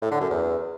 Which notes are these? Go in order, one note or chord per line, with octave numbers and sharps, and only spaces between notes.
A2
D3
F#2
E2